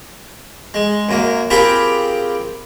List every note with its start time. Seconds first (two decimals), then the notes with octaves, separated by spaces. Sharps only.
0.74 G#3
1.09 F#2 A#3
1.50 C4 F4 G4 G#4 A#4 B5